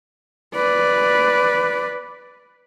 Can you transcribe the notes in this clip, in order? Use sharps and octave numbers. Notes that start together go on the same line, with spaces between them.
B4 D5